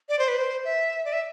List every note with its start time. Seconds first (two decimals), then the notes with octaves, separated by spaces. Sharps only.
0.09 D5
0.19 C5
0.28 B4
0.38 C5
0.65 E5
1.05 D5
1.13 E5